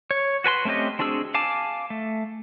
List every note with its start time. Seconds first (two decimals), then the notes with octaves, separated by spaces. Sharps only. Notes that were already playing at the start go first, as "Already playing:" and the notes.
0.11 C#5
0.44 F#4 B4 G#5 C6
0.65 A3 C4 C#4 G4 D#5
0.99 C4 D4 F#4 G#4 E6
1.34 F5 G#5 A5 D6
1.90 A3